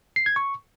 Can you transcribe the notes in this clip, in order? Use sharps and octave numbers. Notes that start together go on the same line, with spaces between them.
C7
G#6
C#6